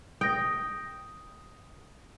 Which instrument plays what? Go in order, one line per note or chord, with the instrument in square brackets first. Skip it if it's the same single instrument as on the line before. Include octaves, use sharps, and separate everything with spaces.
[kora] G5 [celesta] D#6 A#6